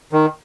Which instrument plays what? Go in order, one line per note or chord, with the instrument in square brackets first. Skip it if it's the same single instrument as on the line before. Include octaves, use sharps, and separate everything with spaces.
[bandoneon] D#3